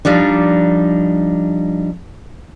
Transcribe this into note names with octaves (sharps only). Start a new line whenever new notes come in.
F3 G3 D4 D#4